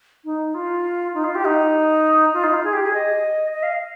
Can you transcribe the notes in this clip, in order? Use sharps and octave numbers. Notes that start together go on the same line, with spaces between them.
D#4
F4
D#4
F4
G4
D#4
F4
D#4
F4
G#4
G4
G#4
D#5
D#5
F5